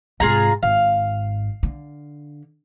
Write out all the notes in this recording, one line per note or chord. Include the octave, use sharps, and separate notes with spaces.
G#2 C3 F4 G#4 A#5
G#1 G#2 F5
D3